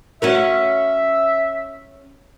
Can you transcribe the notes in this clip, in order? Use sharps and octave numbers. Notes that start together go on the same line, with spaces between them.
C#4 F#4 A#4 E5